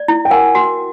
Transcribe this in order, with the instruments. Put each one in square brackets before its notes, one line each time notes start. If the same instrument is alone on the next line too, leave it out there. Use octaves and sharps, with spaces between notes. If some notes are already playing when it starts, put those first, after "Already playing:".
Already playing: [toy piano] D5
E4
[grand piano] G5
[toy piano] A#4 [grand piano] F#5 G#5
[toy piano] F#4